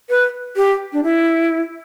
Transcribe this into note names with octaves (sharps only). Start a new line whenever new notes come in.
B4
G4
D4
E4